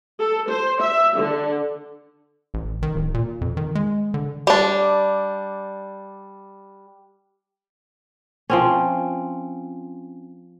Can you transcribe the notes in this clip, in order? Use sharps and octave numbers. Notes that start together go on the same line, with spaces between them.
A4
C5
E5
D3
A1
D#3
D1
A#2
F2
D#3
G#3
D3
G3 D4
F3 C4 C#4